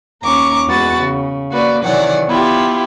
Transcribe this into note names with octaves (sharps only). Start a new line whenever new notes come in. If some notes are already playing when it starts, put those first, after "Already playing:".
D#2 C#4 A#5 C#6 D6
E2 G#3 F#4 B4 F#5 A6
C#3
A#3 F#4 B4 D5
C3 D#3 E3 F#3 D5 F#5
B3 E4 F4 G4